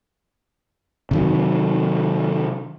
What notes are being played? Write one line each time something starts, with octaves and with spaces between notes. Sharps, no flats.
C3 D#3 F#3